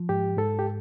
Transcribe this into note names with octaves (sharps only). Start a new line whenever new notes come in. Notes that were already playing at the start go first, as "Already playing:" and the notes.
Already playing: F3
G#2 G4
G#2 A4
G4